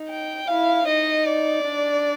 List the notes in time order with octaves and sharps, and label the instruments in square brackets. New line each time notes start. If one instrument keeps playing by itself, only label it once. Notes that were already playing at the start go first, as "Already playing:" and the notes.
Already playing: [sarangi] D#4
[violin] G5
[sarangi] E4 [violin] F5
[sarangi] D#4 [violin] D#5
[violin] D5
[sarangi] D4